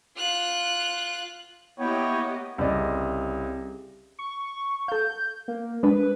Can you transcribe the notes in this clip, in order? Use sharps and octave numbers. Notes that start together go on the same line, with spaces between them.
F4 F#6
A#3 B3 E4 G4 C#5 D#5 G5
C2 C#3 D5 D#5
C#6
A4 F5 G6
A#3
G#3 D4 B4